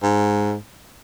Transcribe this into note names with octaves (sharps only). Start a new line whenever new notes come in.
G#2